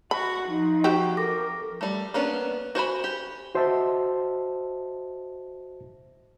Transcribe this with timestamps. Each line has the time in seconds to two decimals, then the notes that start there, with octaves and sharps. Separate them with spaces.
0.11 F#4 B5
0.48 F3 D#4
0.84 C4 F#4 G4 C#6
1.17 A4 A#4 D6 A#6
1.81 G3 A3
2.14 A#3 B3 C#4 D4
2.75 F#4 C5 G#5 B5
3.04 G4
3.55 F#4 C5 D#5 E5 A5